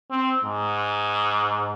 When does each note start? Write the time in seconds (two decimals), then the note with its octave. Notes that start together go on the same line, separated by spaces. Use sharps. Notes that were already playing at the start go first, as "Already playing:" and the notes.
0.11 C4
0.44 G#2